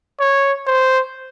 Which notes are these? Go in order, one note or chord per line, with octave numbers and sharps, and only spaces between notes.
C#5
C5